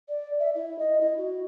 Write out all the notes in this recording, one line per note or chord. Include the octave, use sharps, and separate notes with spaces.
D5
E5
E4
D#5
E4
F#4